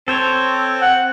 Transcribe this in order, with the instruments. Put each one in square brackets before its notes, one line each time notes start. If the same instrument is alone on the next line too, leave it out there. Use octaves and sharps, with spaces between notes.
[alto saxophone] C4 [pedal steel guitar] A4 C5 C#5
[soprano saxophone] F#5